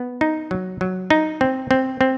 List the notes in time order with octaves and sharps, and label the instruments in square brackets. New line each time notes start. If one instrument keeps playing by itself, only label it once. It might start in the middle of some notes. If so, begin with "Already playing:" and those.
Already playing: [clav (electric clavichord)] B3
D#4
F#3
F#3
D#4
C4
C4
C4